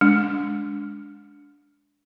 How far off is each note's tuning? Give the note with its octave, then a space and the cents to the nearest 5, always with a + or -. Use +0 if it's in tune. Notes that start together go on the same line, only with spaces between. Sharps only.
G#3 +0 D4 -15